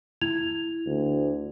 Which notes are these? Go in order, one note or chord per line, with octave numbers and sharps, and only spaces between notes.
E4 G#6 F7
D2